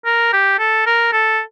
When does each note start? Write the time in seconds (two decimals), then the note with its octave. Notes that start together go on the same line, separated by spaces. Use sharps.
0.05 A#4
0.33 G4
0.59 A4
0.86 A#4
1.13 A4